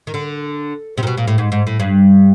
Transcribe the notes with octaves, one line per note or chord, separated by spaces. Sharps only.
D#3
D3
C3
A#2
B2
A#2
A2
G#2
G#2
A2
G2